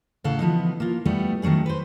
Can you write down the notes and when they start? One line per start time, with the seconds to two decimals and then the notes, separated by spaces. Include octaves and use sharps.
0.24 A2 C#3 A4 F5 F#5
0.39 E3 F3 B3 D#4
0.80 A#3 F4
1.05 G3 A3 B3
1.42 D#3 F#3 A3 C#4 G#4
1.66 B4 C5